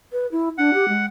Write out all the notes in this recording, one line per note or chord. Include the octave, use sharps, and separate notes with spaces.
B4
E4
D4 F#5
G4
G#3